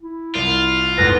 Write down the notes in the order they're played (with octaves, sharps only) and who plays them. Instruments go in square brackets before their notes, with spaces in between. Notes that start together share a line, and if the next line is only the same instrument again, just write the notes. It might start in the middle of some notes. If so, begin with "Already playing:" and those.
[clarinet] E4
[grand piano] C2 [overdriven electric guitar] F4
[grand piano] F1 E2 G#2 [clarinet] B4 [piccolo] A#6